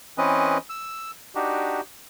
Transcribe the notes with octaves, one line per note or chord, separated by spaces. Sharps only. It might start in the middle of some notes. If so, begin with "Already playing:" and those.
E3 C4 C#4 B4 D#5
E6
D4 D#4 F#4 G4